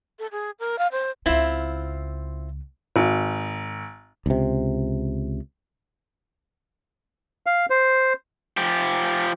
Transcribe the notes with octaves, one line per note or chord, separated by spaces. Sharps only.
A4
G#4
A#4
F5
C5
C#2 C#3 C4 E4 F4
G#1
C#2 C3
F5
C5
F3 G4